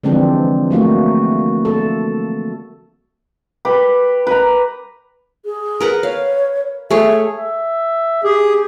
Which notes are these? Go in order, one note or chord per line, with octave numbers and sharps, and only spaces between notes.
D3 E3 F3 G#3 C4 D4
F#3 A3 A#3 F#4
A4
G4 B4
B4 A#5
G#4
A#4 B4 F#5
C#5 F5
A3 G#4 C#5 E5
E5
G4 G#4